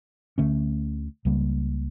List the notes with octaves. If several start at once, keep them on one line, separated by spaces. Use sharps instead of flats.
D2 D3 A3 C#4
C#2 C#3 G3 A#3